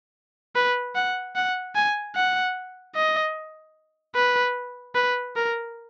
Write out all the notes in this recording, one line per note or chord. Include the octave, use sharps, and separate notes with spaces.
B4
F#5
F#5
G#5
F#5
D#5
B4
B4
A#4